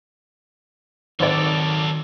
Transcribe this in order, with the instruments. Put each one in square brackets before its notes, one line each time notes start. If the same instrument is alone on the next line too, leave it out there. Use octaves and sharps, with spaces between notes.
[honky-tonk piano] G#1 D5 [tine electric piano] D#3 [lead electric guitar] F#3 A4